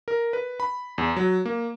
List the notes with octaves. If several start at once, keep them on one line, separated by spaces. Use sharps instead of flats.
A#4
B4
B5
E2
F#3
A#3